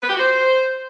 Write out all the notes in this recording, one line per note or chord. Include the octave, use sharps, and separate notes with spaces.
B4
G4
F#4
C5